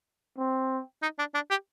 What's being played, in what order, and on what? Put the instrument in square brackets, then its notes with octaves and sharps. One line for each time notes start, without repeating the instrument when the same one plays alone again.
[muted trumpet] C4
[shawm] D#4
D4
D4
G4